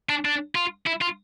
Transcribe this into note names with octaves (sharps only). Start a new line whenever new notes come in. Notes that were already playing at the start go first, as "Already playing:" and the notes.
D4
D4
F4
E4
F4